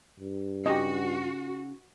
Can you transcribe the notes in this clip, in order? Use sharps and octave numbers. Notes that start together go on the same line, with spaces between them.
G2
C#3 D#4 F#4 G4 D#5 A5